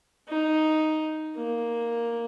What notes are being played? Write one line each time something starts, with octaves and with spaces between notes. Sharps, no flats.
D#4
A#3